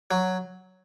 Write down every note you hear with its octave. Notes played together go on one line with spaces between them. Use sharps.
F#3